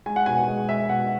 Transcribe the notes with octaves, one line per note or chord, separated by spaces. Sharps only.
G#3 G#5
F#5
B2 G#5
F#5
G#3
G#3 E5
B2 F#5